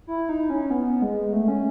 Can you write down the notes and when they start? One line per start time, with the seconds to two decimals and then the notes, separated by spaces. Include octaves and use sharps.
0.07 E4
0.29 D#4
0.50 C#4
0.70 B3
1.02 G#3
1.33 A3
1.48 C#4